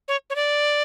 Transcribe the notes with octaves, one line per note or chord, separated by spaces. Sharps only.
C#5
C#5
D5